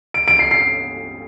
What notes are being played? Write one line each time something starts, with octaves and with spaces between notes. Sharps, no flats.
D7
D7
C7
C7